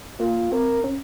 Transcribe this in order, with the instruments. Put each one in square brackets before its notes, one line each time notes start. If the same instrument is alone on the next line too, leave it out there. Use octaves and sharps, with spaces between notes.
[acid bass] A#3 [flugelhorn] F4
[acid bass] C4 [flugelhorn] A#4
[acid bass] C#4